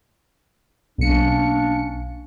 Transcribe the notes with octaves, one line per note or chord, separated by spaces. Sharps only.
B1 A#3 C#4 D4 C#7